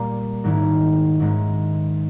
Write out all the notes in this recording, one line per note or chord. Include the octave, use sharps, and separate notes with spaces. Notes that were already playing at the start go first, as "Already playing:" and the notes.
Already playing: A#2 G3 A#3
G#2 D#3 G#3 C#4 E4
G#2 D#3 G#3 C#4 E4